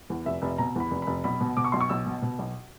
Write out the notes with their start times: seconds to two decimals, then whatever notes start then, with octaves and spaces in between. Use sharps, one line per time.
0.10 E2
0.25 F1 E5
0.42 F1
0.58 B2 A#5
0.75 E2 B5
0.91 F1
1.02 F1 B5
1.24 B1 B5
1.41 B2
1.57 B2 D6
1.64 C#6
1.72 B1 C6
1.81 C#6
1.89 B1 E6
2.06 B2
2.22 B2
2.39 B1